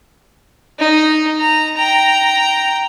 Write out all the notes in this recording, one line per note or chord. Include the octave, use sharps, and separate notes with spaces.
D#4
A#5
G5 A#5